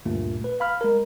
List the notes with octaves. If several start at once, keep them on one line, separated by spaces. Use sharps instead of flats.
D2 G2 A#2 A3
B4
F5 B5 F6
G#3 A#4